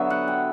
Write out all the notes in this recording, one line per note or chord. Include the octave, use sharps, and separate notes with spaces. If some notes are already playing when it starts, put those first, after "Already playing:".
Already playing: D3 F#3 B3 E5
F#5
G5